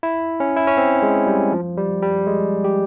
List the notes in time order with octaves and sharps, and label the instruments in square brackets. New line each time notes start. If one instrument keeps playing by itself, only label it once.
[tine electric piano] E4
C#4
E4
C#4
C4
G#3
G3
F3
G3
G3
G#3
G4